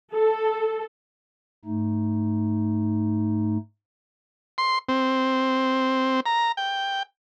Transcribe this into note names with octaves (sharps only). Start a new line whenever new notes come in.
A4
G#2 A3 D#4
C6
C4
A#5
G5